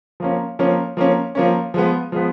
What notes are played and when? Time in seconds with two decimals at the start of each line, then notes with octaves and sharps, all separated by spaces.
0.20 F3 A#3 C#4
0.59 F3 A#3 C#4
0.97 F3 A#3 C#4
1.35 F3 A#3 C#4
1.74 F3 G#3 B3
2.12 F3 G#3 B3